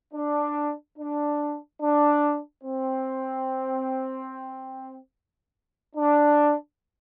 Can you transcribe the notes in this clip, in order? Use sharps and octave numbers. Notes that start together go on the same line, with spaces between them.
D4
D4
D4
C4
D4